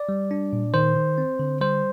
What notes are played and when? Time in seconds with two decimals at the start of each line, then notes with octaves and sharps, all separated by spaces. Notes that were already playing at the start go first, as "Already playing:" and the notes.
Already playing: D5
0.09 G3
0.31 D4
0.53 A#2
0.74 D#3 C5
0.96 D#3
1.18 C4
1.39 D3
1.61 G3 C5